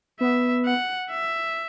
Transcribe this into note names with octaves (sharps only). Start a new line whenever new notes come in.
B3 E5
F#5
E5